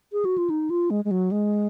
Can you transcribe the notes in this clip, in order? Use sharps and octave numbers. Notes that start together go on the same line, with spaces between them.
G#4
F#4
F4
D#4
F4
G#3
G#3
F#3
G#3